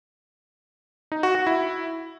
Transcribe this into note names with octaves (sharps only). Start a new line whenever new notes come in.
D#4
F#4
F#4
E4